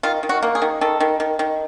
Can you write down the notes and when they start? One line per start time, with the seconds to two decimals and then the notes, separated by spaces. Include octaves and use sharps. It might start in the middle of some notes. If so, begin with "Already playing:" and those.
0.03 D#3 F4
0.23 D#3
0.29 F#4
0.43 A#3
0.55 G#4
0.62 D#3
0.81 D#3 A4
1.00 D#3
1.20 D#3
1.39 D#3